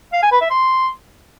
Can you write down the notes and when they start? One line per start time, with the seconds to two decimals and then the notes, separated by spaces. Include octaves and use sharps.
0.13 F5
0.22 G#5
0.32 B4
0.41 E5
0.50 C6